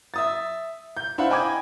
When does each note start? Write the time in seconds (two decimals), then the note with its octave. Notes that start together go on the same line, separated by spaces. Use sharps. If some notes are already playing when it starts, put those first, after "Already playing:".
0.14 E5 D#6 A6
0.97 G6
1.18 D4 E4 C5 F5 F#5 B5
1.30 D#5 G5 G#5 B5 D6 G#6